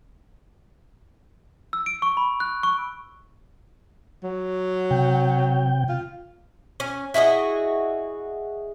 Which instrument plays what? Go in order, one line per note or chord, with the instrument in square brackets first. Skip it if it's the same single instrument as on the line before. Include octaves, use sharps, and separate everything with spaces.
[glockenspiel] E6
D7
C#6
B5
F#6
C#6
[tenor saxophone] F#3
[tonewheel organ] C3 G5
[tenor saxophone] F4
[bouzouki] C#4
E4 F#4 G#4 D#5